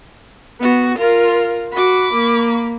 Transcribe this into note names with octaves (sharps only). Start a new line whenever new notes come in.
B3 F#4
F4 A#4
F#4 B5 D6
A#3